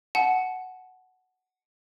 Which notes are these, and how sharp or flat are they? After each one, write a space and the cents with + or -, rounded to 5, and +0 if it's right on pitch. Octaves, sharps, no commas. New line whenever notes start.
F#5 +0 A5 -35